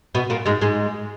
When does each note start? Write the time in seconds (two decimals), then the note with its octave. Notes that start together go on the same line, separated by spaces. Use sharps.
0.15 B2 B3
0.30 A#2 A#3
0.46 G#2 G#3
0.61 G#2 G#3